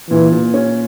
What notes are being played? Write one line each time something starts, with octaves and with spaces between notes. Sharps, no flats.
A#2 E3
A#2
C#4